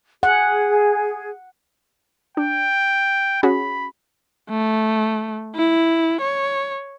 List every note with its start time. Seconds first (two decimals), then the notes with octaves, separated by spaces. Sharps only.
0.23 G#4 F#5
2.37 D4 G5
3.43 C#4 F#4 G#4 B5
4.50 A3
5.55 E4
6.21 C#5